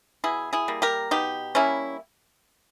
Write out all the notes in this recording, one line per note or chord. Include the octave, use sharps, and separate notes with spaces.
B2 E4 G#4
E4 G#4
G3 A#3
G4 A#4
B2 D#4 G4
G3 A#3 C#4 E4